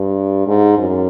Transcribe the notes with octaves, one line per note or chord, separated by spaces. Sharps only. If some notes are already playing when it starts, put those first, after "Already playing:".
Already playing: G2
G#2
F#2